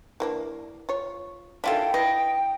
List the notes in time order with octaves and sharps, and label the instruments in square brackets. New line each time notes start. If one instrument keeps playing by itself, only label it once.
[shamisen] E3 A#3 D4
F4 C#5
[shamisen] D#3 F#3 D4 [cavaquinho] E4 F4 A4 [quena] G5
[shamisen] E4 B4 [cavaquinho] D#5